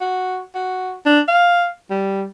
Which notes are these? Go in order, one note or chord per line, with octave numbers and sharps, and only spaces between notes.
F#4
F#4
D4
F5
G3